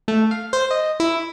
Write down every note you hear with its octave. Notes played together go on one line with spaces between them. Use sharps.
A3
F5
C5
D#5
E4